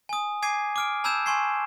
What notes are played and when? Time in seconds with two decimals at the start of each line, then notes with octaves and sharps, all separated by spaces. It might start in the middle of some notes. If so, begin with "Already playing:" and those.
0.09 G#5 D#6
0.42 G#5 D6 G#6 C7 D#7
0.76 D6 F6 D7
1.04 A5 B5 E6 G6 G#6 E7
1.26 G#5 C6 C#6 G#6 C7